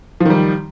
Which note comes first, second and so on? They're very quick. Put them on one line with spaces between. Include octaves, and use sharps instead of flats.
F3 D#3 G3